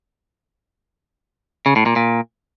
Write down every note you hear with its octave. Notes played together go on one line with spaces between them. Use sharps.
C#3
A2
A#2
A#2